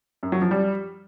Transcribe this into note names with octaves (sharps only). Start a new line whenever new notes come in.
F#2
F#3
F3
G3